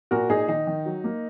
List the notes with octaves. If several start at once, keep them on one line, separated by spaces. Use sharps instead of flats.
A#2 F#4 A#4
A#2 D#4 G#4
D#3 D#4
D#3
F#3
A#3